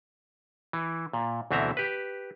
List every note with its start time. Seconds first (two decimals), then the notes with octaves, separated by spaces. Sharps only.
0.73 E3
1.13 A#2
1.51 D2 B2 E3 C4 E5 A#5
1.77 G4 B4